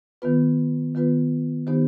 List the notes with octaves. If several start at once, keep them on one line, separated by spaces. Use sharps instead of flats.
D#3 B3 F4 B4
D#3 B3 F4 B4
D#3 B3 D#4 G4 C5